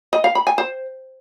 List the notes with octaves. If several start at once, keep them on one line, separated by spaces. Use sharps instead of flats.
D#5
F5
B5
G#5
C5